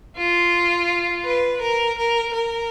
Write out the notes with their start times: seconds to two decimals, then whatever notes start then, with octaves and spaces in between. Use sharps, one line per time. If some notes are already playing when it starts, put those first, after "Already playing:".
0.17 F4
1.25 B4
1.62 A#4
1.98 A#4
2.34 A#4